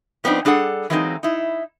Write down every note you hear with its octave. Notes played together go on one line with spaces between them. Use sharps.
F3 B3 C4 D4 D#4
G3 D4 G#4 A4 F#5
E3 F#3 G#3 A#3 C4 D#4
D#4 E4